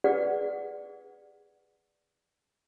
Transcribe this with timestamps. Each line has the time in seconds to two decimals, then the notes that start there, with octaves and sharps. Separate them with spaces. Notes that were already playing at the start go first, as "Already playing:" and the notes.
0.04 G#4 B4 D5 F#5